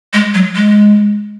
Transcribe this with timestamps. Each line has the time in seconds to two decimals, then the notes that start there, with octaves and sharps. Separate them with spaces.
0.13 G#3
0.34 F#3
0.56 G#3